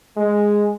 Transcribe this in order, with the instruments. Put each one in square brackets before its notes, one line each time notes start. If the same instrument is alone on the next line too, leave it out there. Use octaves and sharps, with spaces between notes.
[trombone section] G#3